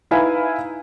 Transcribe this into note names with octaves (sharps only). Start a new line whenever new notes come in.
D#4 E4 B4 F5 G#5